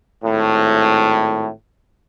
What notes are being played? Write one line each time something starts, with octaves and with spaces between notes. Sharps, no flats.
G#1 A2